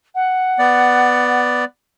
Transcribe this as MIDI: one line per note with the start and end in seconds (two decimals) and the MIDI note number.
0.15 1.40 78
0.59 1.65 59
0.59 1.65 74